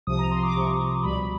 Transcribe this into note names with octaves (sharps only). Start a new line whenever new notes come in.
C2 C3 F3 D#6
A#5
C6
D6
C2 C3 F3 C#6
C#2 B2 G3 B5